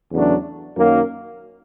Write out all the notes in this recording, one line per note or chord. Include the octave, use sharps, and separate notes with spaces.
E2 C#3 F#3 A3 D4
F#2 D#3 F#3 A#3